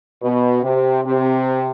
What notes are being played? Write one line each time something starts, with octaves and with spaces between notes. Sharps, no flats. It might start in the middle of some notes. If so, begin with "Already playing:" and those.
B2
C3
C3